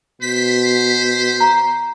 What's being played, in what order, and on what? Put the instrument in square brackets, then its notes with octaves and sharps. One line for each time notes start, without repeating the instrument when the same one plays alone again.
[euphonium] B2 [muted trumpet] C5 [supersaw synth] B6
[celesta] A#5